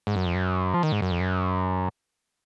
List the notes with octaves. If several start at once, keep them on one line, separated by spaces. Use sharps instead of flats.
G#2
F#2
F2
F#2
F3
D#3
G#2
F#2
F2
F#2